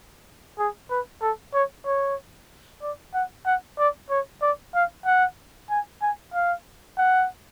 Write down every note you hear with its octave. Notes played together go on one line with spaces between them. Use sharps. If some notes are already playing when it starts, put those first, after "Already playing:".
G#4
B4
A4
C#5
C#5
D5
F#5
F#5
D5
C#5
D5
F5
F#5
G#5
G#5
F5
F#5